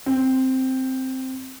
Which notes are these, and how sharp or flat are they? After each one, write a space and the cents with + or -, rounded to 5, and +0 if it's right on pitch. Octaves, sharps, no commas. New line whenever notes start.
C4 +0